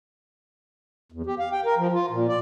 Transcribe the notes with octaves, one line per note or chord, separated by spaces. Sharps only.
E2
G4
F5
G5
A#4
F3
F4
A#2
D5